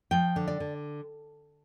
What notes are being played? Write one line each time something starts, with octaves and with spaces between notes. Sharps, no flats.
F3 G5
D3
D5
D3